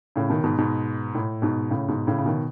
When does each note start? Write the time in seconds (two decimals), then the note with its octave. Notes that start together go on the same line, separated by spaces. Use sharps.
0.16 A2 C#3
0.30 B2 D#3
0.44 G#2 B2
0.58 G#2 B2
1.15 A2
1.42 G#2 B2
1.70 A2 C#3
1.88 G#2 B2
2.07 A2 C#3
2.18 C#3
2.26 B2 D#3